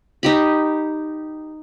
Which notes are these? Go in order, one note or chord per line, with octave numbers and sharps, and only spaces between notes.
D#4 G4 B5